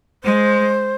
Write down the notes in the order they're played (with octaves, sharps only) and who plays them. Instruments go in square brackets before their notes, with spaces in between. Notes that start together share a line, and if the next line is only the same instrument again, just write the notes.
[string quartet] G#3 [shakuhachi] C5